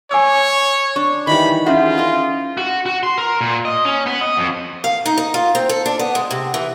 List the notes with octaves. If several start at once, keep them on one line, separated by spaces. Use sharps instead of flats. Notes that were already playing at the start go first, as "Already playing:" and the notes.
C#5 G#5 D6 E6
D4 C#6
D#3 E3 G3 B5
C#4 F4 G#4 C5 E5 F#5
A#4 D#5
F#4
F#4
C6
A#4
A#2
D#5
C#4
B3
D#5
F2
F5
D#4
D#4
F4
C4
A4
D4
B3
G#3
C3
E3